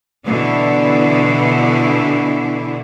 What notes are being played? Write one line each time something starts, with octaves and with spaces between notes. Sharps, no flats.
B2 D3 E3 D4 E4